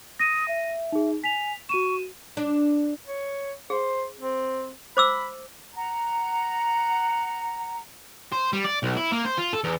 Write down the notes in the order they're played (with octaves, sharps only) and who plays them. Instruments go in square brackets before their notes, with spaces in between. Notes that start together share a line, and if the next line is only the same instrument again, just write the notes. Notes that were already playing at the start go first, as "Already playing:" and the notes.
[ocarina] D#6 [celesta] A#6 D#7
[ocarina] E5
[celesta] D#4 G#4
[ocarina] G#5 [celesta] B6 F7
[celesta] F#4 D#7 E7 [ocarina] C#6
[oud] D4
[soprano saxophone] C#5
[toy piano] G#4 [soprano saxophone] C5
[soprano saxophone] C4
[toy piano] C5 D6 E6 [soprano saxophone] B5
[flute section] F#5 A#5
[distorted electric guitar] C5
G3
D5
B1
E4
A#3
C5
F4
A4
E2